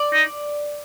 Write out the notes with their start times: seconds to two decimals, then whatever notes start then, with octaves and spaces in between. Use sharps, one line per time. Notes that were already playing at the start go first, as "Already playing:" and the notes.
Already playing: D5
0.13 D#4